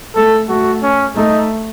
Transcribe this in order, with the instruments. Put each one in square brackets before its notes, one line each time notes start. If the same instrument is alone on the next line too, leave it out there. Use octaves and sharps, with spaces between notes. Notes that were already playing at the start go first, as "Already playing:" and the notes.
[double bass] A3 [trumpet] A4
[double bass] A3 [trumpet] F#4
[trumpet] C#4
[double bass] A3 [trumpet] D#4